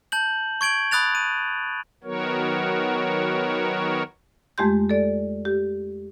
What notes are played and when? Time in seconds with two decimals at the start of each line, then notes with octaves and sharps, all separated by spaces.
0.12 A5 G6 F#7
0.61 C#6 G#6 D7 F#7
0.91 B5 D#6 F#6 A6 F7
1.15 D#7
2.04 D#3 F#3 B3 F#4 A#4 C#5
4.58 F2 G#3 A3 G4 C6 G6
4.89 A4 D5
5.45 G4